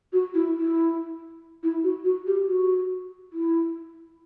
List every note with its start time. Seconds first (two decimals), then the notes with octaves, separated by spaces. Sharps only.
0.13 F#4
0.34 E4
0.56 E4
1.63 E4
1.84 F#4
2.05 F#4
2.27 G4
2.47 F#4
3.33 E4